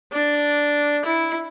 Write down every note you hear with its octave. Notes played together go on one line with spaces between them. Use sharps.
D4
E4